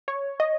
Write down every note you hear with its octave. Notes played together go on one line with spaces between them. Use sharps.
C#5
D#5